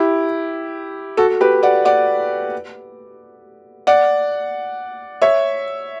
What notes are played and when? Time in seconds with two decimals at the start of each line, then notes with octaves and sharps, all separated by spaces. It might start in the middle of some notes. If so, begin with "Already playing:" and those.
Already playing: E4 G4
1.17 F#4 A4
1.41 G4 B4
1.63 D5 F#5
1.85 D5 F#5
3.87 D5 F#5
5.22 C#5 E5